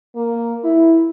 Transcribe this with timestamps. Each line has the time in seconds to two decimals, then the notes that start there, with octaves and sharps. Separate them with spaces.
0.15 A#3
0.63 E4